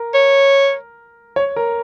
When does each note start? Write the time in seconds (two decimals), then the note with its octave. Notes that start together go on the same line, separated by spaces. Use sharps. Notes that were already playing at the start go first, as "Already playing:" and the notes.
Already playing: A#4
0.14 C#5
1.36 C#5
1.56 A#4